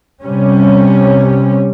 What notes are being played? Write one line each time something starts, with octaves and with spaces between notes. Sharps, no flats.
C3 G3 C#4